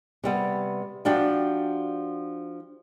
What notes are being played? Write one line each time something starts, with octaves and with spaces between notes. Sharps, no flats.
C3 G3 B3
F3 D4 F#4 G4